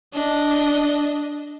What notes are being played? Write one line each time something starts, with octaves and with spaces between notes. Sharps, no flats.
D4 D#5